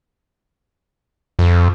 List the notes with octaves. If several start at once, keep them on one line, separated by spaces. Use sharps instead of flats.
F2